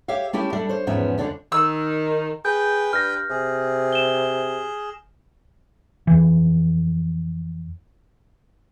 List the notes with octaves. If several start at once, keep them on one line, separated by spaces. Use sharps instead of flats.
G4 C#5 E5 F5
A3 C#4 E4 G4
G3 D4 A4 E5
C5 C#5
E2 G#2 F3 B3 C#4 E5
F2 D3 F3 C#4 D4
D#3 E6
G#4 B4 G5 G6
G2 F6 A#6
C3 G#4
E7 G7
F2 E3